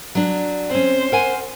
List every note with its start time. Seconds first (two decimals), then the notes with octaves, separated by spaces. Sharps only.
0.15 F#3 D4
0.71 C4 C#4 C5
1.12 A#4 F#5 G#5